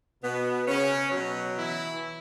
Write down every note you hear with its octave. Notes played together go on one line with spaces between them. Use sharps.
B2 B3
C#3 C#4
B2 F#3
E3 E4